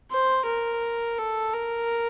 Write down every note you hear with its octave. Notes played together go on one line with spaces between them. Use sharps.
C5
A#4
A4
A#4